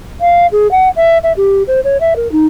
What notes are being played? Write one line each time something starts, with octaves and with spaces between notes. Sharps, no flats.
F5
G#4
F#5
E5
E5
G4
C5
C#5
E5
A#4
D#4